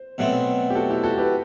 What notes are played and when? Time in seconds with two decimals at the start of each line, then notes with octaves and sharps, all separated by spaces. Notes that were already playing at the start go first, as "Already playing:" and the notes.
Already playing: C5
0.18 B2 F#3 A3 C4
0.70 G4
0.75 F#4 A4
0.90 E4 G4
1.04 F#4 A4
1.18 G4 B4